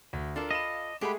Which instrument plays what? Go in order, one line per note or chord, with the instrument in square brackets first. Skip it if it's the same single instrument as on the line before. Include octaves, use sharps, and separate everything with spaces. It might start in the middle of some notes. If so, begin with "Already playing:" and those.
[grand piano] D2
[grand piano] D4 A#4 [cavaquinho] F4 A4 D5
[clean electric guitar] D#5 [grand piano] F5 B5 E7
[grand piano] G#3 A3 G#4 [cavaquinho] G4 F#5 B5